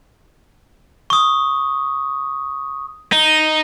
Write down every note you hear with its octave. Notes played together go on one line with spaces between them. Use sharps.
C#6 D#6
D#4